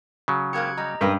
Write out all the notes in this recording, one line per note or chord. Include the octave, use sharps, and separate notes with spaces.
C#3 F#3
G#2 A#3 G4 F#6 G#6 C#7
G3 D#5 A#5
G2 C3 C#4 A#4 B4